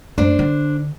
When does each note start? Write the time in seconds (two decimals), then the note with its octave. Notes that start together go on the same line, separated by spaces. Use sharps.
0.18 F#2 A3 D4 C5
0.39 D3